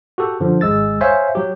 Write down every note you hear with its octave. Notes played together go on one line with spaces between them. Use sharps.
F#4 G4 A4
F#2 D3 F3
G#1 G#3 E6 A6
C5 C#5 E5 F5 G#5
F#3 G4